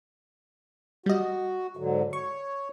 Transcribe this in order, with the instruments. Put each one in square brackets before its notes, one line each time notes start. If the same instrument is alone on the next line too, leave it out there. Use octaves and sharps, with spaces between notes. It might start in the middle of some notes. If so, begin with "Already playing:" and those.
[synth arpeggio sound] G3 D#5 [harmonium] F#4
[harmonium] G#2 D3 F#3
[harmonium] C#5 [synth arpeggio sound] C#6